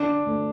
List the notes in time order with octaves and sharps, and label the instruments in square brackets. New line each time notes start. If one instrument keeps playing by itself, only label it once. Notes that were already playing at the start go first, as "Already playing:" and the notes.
Already playing: [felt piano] D3 [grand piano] D4 D5
[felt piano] D2